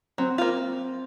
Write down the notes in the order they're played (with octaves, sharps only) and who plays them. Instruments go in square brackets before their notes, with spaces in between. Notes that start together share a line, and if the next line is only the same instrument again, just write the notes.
[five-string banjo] F#3 [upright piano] C4
[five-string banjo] A#3 F4